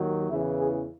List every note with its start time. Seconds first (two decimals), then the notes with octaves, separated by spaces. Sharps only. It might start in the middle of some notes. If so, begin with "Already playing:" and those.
Already playing: D#2 D#3 F#3
0.30 E2 C#3 E3 E4
0.59 G#4